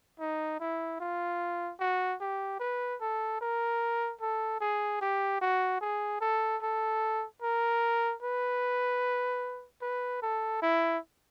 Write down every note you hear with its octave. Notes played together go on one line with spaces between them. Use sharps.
D#4
E4
F4
F#4
G4
B4
A4
A#4
A4
G#4
G4
F#4
G#4
A4
A4
A#4
B4
B4
A4
E4